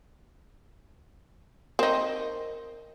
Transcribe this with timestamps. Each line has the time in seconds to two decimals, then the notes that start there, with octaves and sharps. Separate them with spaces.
1.79 C4 D#4 A#4 C#6